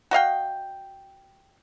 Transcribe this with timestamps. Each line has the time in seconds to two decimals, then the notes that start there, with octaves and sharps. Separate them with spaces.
0.11 F#4 D#5 F5 G5